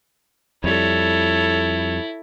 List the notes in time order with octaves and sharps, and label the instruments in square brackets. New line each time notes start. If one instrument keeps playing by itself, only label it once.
[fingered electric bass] F2 G3 [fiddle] E4 [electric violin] A4 C#5